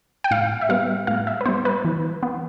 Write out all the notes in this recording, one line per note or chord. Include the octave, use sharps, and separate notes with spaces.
G5
A2 F5
E5
G3 B3 F5
A2 F5
E5
B4
G3 B3 C5
B4
E3
B3